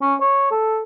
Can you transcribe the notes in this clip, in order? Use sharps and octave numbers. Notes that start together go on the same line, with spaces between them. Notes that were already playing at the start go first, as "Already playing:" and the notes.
C#4
C#5
A4